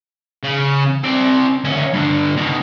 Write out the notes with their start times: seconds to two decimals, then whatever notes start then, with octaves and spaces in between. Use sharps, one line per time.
0.43 C#3
1.03 C4 D5
1.64 D2 C#4
1.93 G2 D3
2.37 B2 D#3